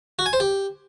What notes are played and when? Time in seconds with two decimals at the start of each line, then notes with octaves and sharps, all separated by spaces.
0.19 F#4
0.26 G#5
0.33 C5
0.40 G4